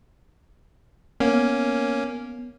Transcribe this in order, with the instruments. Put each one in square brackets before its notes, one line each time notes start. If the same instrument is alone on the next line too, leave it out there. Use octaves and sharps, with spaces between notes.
[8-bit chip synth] A#3 C#4 [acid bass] B3